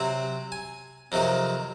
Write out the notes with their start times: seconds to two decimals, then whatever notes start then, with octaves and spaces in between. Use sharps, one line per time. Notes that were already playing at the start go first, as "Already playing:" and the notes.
Already playing: C3 F#3 C4
0.52 G#5
1.12 F2 C3 D#3 F#3